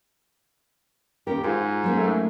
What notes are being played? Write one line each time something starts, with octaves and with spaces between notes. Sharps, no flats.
D#2 C#4 G4 A#4
G#2 F4 C5
F#3 A#3 C#4
A3